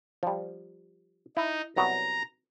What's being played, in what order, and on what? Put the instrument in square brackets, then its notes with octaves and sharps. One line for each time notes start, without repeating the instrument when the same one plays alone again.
[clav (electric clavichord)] F3 G3
[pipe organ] D#4 [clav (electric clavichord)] E4
[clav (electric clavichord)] C2 F#3 B3 [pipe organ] A#5